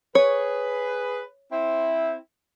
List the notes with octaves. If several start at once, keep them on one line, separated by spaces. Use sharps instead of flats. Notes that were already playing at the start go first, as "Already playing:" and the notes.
G#4 B4 C#5
C4 E4